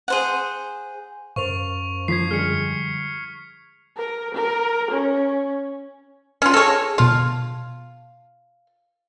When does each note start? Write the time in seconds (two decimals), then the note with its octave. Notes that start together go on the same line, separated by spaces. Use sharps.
0.08 G#4 C5 F#5
1.36 F#2 A#4 C5 F5 C#6 F7
2.08 F3 G#6 B6 C7
2.31 D3 F3 G3 G#3 F6 C#7
3.97 A#4
4.35 A#4
4.91 C#4
6.42 C#4 F4
6.54 G#4 A4 C#5 A#6
6.98 B2 F4 A5